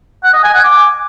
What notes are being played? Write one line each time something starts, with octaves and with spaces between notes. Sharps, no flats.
F#5
D#5
G#5
F#5
D6